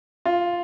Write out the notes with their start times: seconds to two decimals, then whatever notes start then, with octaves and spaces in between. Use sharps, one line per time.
0.25 F4